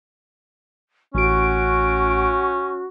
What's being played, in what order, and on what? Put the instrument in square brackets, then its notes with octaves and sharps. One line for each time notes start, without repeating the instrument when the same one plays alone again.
[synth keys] A1 D7 [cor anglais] C#4 [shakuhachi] F#4